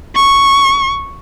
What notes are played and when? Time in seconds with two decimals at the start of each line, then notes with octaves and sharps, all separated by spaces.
0.15 C#6